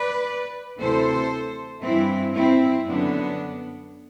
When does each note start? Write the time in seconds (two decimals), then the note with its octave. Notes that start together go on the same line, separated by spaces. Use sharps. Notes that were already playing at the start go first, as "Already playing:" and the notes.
Already playing: B4 D5
0.80 D2 C3 E3 A4 C5
1.83 G2 E3 C4 E4
2.35 C4 E4
2.86 F#2 D3 B3 D4